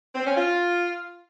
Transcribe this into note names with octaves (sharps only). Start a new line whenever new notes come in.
C4
C#4
F4